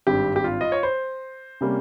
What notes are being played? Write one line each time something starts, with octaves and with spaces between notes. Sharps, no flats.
G#1 G2 G3 C4 G4
G4
F4
D#5
C#5
C5
C3 G3 A#3 C#4